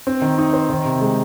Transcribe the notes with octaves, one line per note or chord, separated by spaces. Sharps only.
C4
D#3
D#4
C5
D#3
C3
G#3